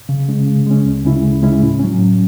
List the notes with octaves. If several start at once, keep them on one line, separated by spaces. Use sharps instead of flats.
C#3
G#3 C#4
C#3
G#3 C#4
D2
C#3 G#3 C#4 E4
D2
C#3 G#3 C#4 E4
A2
F#3 C#4
A2